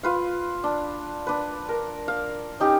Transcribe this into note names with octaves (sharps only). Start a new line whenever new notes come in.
F4 B4 F5
D4
D4 B4
A#4
F5
C#4 D#4 G4